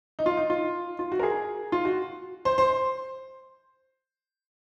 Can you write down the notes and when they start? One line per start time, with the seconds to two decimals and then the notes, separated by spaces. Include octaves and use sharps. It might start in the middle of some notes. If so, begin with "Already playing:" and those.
0.19 D#4
0.26 F4
0.37 D#4
0.50 F4
0.99 F4
1.12 F#4
1.19 A#4
1.23 G#4
1.72 F4
1.85 F#4
2.45 C5
2.58 C5